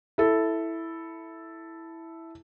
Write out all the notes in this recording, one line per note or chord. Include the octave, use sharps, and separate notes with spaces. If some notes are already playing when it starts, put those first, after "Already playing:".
E4 A4